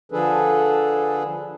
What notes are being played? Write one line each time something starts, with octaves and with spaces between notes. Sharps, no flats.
D3 F3 D4 G#4 A4 B4